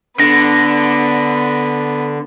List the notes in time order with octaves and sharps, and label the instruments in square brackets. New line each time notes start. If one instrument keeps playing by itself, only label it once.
[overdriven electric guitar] D3 [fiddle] B3 [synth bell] A#6